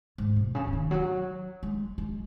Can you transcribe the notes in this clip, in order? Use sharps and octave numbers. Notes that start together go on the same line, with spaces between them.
G#2
B2
C#3
C#3
D#3
F#3
G#3
G#3